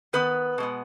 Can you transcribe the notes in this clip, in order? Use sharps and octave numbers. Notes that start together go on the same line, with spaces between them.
D#3 B3 B4
B2 G#3 B3